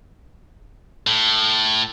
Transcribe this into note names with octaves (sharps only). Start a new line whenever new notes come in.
A2